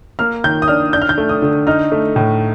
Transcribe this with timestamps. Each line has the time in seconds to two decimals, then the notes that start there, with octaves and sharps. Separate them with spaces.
0.19 A#3 F6
0.44 D#3 G6
0.62 D#6
0.68 D4 F6
0.93 D4 G6
1.02 F6
1.09 G6
1.18 A3
1.29 D#6
1.42 D3
1.67 D#4 F6
1.92 A3
2.16 A2